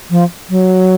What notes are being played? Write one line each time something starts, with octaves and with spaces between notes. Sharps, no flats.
F3
F#3